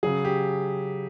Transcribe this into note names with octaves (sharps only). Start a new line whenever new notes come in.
C#3 F#3 G#4
G4